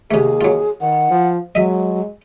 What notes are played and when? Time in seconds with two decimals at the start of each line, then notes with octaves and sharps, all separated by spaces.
0.11 D#2 C3 A3 G#4
0.41 F#3 F4
0.81 D#3 F#5
1.10 F3
1.55 F#3 G#3 D#5 E5